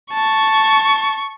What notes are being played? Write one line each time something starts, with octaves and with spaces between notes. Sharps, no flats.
A5 C#6